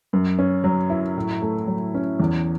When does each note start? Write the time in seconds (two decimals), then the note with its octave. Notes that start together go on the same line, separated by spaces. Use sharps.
0.13 F#2
0.39 C#4
0.64 F#3
0.90 E4
1.17 A2
1.42 A3
1.67 F#3
1.94 C#4
2.20 E2